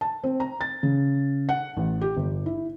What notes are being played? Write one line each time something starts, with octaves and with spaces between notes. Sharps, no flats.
A5
C4
A#5
A6
C#3
F#5
A1
G4
G1
E4